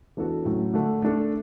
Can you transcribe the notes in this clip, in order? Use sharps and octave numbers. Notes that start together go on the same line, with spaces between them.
E3 B3 D4 F#4 A4
A2 F#3 C#4
D3 A3 D4 A4
A3 D4 A4